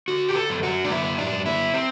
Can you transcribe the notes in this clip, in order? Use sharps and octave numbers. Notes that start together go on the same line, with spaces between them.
D3 F#4
G4
A4
F#2
F#4
D4
F#2 E4
D4
F#2
E4
C4